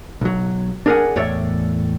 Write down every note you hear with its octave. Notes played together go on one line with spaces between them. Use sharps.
B1 F#3
D4 G#4 A#4 C5 F#5 G#5
E2 A2 C#5 D5 E5